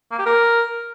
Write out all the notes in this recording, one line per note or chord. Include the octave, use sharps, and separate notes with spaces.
A#3
G4
A#4